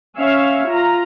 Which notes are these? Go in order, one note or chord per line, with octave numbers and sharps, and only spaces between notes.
C#4 C#5 E5 F5
F4 A#5